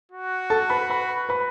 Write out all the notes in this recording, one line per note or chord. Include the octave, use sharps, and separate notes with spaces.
F#4
A4 A5
B4 B5
B4 B5
B4 B5